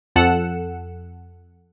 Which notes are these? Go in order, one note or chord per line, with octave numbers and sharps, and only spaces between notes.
F2 A4 F#5 C#7 E7